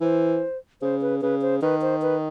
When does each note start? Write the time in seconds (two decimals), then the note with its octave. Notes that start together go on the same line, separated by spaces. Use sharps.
0.01 E3 C5
0.82 C#3 C5
1.01 B4
1.21 C#3 B4
1.42 C5
1.62 D#3 B4
1.82 C5
2.02 B4